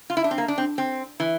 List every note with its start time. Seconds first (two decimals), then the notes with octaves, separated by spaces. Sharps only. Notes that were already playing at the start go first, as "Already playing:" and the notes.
0.10 F4
0.17 E4
0.24 D4
0.31 C4
0.38 A#3
0.48 D4
0.58 C4
0.78 C4
1.20 E3